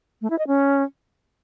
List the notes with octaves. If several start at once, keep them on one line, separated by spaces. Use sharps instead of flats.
A3
E4
D#5
C#4